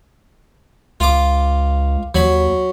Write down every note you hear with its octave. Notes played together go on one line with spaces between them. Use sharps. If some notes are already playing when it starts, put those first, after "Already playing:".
C#2 F4 D6
D#2 F#3 B5